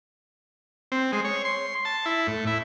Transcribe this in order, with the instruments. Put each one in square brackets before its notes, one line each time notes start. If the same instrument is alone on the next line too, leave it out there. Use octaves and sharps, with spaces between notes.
[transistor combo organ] C4
G#3
C#5
C6
A5
E4
A2
E4